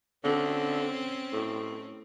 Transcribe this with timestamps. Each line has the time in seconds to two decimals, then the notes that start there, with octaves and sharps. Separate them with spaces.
0.24 D3 C4 C#4
1.33 A2